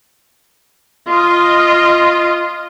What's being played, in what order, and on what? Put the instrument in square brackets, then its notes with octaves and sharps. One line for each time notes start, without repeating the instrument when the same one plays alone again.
[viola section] F4 D#5